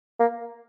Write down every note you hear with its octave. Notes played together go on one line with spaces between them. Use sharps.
A#3